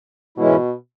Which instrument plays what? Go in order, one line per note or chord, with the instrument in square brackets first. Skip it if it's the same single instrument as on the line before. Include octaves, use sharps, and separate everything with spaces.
[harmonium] G#2 E3 G#3 C#4 E4 [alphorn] B2